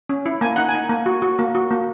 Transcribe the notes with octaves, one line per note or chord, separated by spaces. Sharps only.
C#4
E4
A#3 G#5
D#4 F#5
G#5
D#4
A#3
F#4
F#4
A#3
F#4
A#3